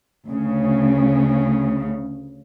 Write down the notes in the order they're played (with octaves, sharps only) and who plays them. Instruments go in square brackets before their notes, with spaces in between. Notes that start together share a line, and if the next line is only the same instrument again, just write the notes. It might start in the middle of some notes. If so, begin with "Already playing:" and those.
[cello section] D2 C#3